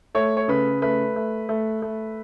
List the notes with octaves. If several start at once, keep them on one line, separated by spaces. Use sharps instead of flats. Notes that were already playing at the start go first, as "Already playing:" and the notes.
A3 C#5
C#5
C#3 B4
A3 B4
A3
A3
A3